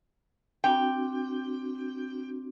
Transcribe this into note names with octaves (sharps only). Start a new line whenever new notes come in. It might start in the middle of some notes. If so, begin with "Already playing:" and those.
C4 D4 F#4 G5